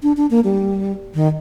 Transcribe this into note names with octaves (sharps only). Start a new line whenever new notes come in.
D4
D4
A#3
G3
D#3